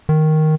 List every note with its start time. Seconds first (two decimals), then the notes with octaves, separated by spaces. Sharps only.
0.09 D#3